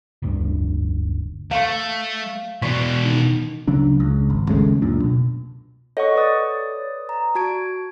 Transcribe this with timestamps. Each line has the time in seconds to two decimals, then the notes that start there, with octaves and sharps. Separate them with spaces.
0.22 F1 D2 G2
1.51 A3 F5 C#6
2.62 B2 E3 D5 C#6 B6
3.05 D#3
3.68 D2 C#3 F#3 D4
4.00 C#2
4.30 G#1
4.49 D#2 C#3 G#3 A3
4.82 C#2 F#2 A#2 D4
5.02 B2
5.97 A4 C#5 D#5 F#5 C#6
6.15 B4 D5 D#6
7.09 A#5
7.35 F#4 A5 G#6 D7